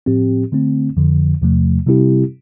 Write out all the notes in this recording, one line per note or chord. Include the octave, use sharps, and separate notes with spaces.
A2 F3 C4 G4
D3 A3 C4
F2 D3 F3
E2 C3 F3 A3
C3 G3 C4 E4 G4